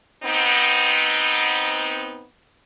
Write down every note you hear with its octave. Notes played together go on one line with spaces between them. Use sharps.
B3 C4 D#4